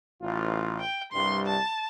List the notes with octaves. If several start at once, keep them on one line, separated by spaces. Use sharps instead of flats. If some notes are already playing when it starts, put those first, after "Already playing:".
A1 F4
G5
C2 G2 G3 C6
A5